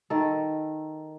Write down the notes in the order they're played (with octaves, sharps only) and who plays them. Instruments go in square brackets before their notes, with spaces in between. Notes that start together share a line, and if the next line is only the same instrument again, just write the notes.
[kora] D#3 A4